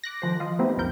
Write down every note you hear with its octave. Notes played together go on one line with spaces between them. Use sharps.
D6 F#6 A#6
D#3 F3 C5
F4 D#5
A3 B3 C4 D#4 E4 G4
C2 F2 F3 A#4 G6